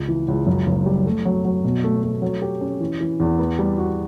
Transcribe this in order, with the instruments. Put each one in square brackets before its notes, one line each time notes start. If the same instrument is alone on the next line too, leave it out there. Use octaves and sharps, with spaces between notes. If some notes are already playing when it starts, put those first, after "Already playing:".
Already playing: [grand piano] C#2
E3
C#2
F#2
F#1
G3
A3
F#3
F#3
B2
A3
A3
F#3
G4
C#4
E3
E3
E2
B3
G3
F#4